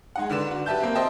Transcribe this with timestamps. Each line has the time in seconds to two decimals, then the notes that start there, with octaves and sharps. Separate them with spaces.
0.16 G#3 D#4 F#5
0.29 G#2 D3 B4 D5 E7
0.51 F#4
0.66 G4 B4 E5 A5 G6
0.80 A#3 C4
0.95 C5 D#5 E5 G5 A5